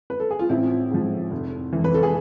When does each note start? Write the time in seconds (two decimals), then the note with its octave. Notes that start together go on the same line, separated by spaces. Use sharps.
0.10 B4
0.20 A4
0.31 G#4
0.39 F4
0.49 A1 C4 E4
0.91 G#2 F3
1.31 F1
1.73 F2 E3
1.84 B4
1.94 A4
2.03 G#4